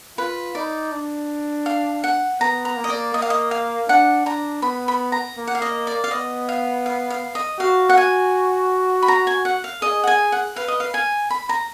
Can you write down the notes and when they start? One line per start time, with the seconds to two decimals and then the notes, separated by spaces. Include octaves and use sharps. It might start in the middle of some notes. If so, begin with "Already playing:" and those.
0.18 F4 B4
0.55 D#4 D5
0.92 D4
1.66 F5
2.04 F#5
2.41 B3 A#5
2.65 A#5
2.77 A#3
2.84 D#5
2.90 D5
3.14 A#3 D#5
3.22 F5
3.30 D#5
3.51 F5
3.88 D4 F#5
4.25 D4 A#5
4.62 B3 B5
4.88 B5
5.12 A#5
5.37 A#3
5.47 F#5
5.55 F5
5.62 D#5
5.87 D5
6.04 F5
6.11 B3 D#5
6.49 F5
6.86 F5
7.10 F5
7.35 D#5
7.60 F#4 F5
7.89 F#5
7.97 G#5
9.02 B5
9.08 A#5
9.27 G#5
9.45 F#5
9.64 F5
9.82 G#4 D#5
10.04 F#5
10.07 G#5
10.32 F#5
10.56 B4 F5
10.68 D#5
10.80 F5
10.94 G#5
11.30 B5
11.49 A#5